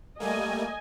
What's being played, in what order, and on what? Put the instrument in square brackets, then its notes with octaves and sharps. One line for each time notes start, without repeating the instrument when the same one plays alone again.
[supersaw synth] G3 A3 A#3 [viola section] D#5 G#5